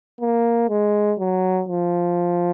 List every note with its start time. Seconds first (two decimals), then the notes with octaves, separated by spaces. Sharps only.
0.21 A#3
0.69 G#3
1.19 F#3
1.69 F3